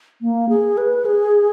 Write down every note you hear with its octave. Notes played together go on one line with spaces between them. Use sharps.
A#3
G#4
B4
G#4